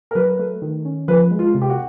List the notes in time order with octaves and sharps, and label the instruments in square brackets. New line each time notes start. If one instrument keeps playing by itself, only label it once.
[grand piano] A#4
[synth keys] F#3 [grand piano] B4
[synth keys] A3
D#3
C#4
[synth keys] F3 [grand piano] B4
[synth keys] G#3
[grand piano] F4
[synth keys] C3
[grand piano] G4
F#4